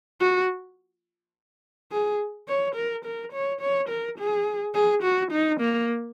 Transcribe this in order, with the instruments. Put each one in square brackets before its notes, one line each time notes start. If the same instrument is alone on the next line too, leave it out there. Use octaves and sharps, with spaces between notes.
[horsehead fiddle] F#4
G#4
C#5
A#4
A#4
C#5
C#5
A#4
G#4
G#4
F#4
D#4
A#3